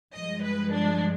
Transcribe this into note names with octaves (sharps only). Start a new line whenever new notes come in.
G2 F3 G#3 D#5
B4
D4